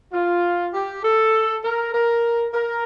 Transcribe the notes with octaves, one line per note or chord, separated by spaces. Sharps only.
F4
G4
A4
A#4
A#4
A#4